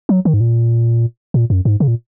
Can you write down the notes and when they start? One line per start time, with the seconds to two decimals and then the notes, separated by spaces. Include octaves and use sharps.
0.09 F#3
0.25 D#3
0.34 G#2
0.40 A#2
1.34 A#2
1.50 F#2
1.65 G#2
1.80 C#3
1.88 A#2